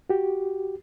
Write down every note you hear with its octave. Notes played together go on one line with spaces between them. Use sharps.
F#4 G4